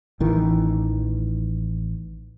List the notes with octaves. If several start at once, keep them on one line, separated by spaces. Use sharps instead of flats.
A1 D#3 E3